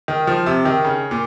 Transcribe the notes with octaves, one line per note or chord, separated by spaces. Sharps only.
D#3
F3
C3
D#3
C#3
A#2